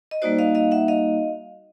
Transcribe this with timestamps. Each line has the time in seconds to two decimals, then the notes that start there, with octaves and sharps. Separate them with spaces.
0.11 D#5
0.22 G3 A#3 D#4 F#4 C5 D5
0.39 D#5 F5
0.55 D#5 F5
0.71 E5 F#5
0.88 D#5 F5